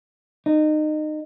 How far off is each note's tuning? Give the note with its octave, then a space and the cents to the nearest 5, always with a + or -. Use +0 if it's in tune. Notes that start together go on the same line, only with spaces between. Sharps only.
D#4 -25